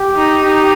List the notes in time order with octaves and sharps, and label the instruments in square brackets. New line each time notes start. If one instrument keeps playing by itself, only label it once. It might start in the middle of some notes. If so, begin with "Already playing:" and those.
Already playing: [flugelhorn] G4
[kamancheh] D#4
D#4